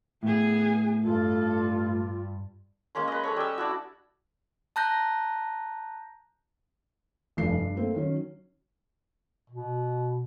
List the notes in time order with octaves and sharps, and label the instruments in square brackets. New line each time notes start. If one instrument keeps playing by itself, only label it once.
[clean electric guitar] A2 [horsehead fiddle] B3 G#4
[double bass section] G2 [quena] F4 [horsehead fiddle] A4
[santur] G#3 A#3 C#4 C6
B4 D#5
C#4 A4 C#5
G3 E6
D4 E4 F#4
[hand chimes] A5 A#5 F#6 G6 A#6
[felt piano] F1 G2 F3 C7
G2
A3 A#3 C4
D#3 F#3 C#4
[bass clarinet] B2